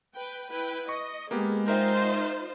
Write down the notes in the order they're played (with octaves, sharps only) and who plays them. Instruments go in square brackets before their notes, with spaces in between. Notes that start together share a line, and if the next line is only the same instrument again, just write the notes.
[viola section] B4 G5
E4 B4 G5
[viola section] D#5 [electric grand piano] C#6
[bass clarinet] G#3 [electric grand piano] A#3 B3 G4 [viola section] G#4
[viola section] D#4 F4 C5 [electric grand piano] A#4 E5 G5